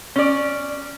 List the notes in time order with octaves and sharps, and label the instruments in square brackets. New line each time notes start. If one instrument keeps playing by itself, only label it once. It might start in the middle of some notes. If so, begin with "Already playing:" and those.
[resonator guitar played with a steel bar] C#4 D5